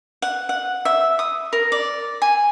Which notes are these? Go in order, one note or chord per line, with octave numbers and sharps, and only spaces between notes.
F#5
F#5
E5
D#6
A#4
D5
G#5